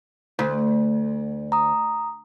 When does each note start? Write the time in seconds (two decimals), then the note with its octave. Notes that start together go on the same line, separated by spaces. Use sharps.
0.39 D2
1.52 A#5 D#6